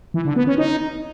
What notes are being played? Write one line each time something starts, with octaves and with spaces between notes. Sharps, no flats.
E3
D3
B3
C#4
D#4